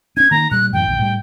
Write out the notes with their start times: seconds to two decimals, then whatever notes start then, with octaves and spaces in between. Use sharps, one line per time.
0.17 C#4 D4 G#6
0.31 D#3 A#3 A#5
0.51 A#2 G3 F#6
0.73 F#2 A2 E3 G5
0.87 A#1 D#2
0.99 A2 G3